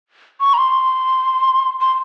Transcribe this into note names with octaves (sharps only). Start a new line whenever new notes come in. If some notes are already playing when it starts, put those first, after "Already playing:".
C#6
A#5
C6
C6